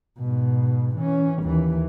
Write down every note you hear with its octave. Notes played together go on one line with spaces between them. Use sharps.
G#2 B2
E3 C#4
D#2 E3